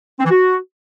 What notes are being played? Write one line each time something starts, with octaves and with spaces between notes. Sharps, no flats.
C4
E3
F#4